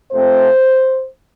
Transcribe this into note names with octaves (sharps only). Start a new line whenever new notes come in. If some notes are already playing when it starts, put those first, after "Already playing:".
F2 C3 F3 A3 C4 C5